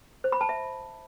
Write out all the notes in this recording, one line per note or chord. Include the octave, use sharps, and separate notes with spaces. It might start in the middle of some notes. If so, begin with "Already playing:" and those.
C5
B5
A5
E5